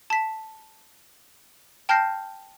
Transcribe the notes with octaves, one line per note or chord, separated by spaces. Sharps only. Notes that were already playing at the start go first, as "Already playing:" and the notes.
A5 B6
G5 A5 F6 G6 A#6 C7